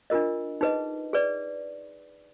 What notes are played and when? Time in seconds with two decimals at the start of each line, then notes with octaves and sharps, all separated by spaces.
0.10 D4 F4 A#4 D#5
0.61 D#4 G#4 B4 D#5
1.13 G#4 B4 D5